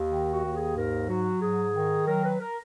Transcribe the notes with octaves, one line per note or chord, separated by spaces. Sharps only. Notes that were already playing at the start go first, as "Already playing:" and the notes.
Already playing: D#2
D#3
F#4
D#2
G#4
G#2 A#4
F#3 F#4
G#2 G#4
D#3
F#3 A#4
B4
A#4